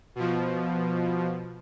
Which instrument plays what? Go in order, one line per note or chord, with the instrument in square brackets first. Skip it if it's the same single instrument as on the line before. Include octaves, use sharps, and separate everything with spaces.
[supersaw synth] B2 F3